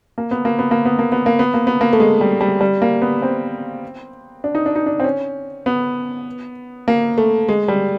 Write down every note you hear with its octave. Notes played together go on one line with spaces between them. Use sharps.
A#3
B3
A#3
B3
A#3
B3
A#3
B3
A#3
B3
A#3
B3
A#3
A3
G#3
G3
G3
G3
A#3
B3
C4
D4
D#4
D4
D#4
D4
C4
C#4
B3
A#3
A3
G#3
G3